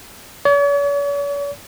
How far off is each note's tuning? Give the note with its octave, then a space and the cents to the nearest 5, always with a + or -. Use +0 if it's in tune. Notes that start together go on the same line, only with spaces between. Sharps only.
C#5 +45